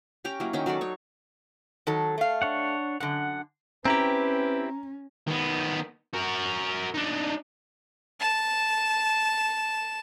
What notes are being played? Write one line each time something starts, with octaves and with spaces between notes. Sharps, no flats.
C#4 G4 G5 A#5
F#3 A#3 E4
D#3 F#3 C#4 G5
F#3 F#4 A4 D5
D#4 C#5
D#3 F#3 A4
A3 F5
D4 C#5 F#5
F#2 D3 F#5
C4 C#4 E4 G4 B4 A#5
D#3 B3
F#4 A#4
D4 D#4
A5 E7